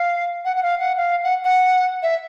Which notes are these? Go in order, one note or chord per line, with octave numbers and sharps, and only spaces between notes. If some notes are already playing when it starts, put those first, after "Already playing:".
Already playing: F5
F#5
F#5
F5
F#5
F5
F#5
F#5
E5